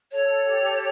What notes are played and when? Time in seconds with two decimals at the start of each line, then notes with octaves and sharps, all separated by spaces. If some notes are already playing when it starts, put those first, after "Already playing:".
0.12 A4 C#5
0.44 G4